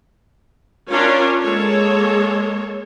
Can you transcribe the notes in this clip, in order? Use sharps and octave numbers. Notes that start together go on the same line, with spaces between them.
C#4 D4 F4 A#4 C#5
G#3 A#3 A4 C#5